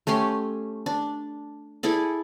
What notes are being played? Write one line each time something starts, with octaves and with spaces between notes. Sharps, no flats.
A3 C#4 G4 C6
D4
E4 G#4 A4 D5